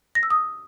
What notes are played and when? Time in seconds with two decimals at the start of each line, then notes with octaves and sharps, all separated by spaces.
0.15 A#6
0.23 E6
0.30 D#6